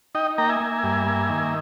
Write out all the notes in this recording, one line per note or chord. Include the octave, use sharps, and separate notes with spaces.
D#4 D#5 G5
A#3 G5 A#5
E5 G#5
A#3
G2
A#3
D#3